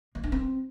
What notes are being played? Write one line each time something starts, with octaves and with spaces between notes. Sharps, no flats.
A#3
D4
C4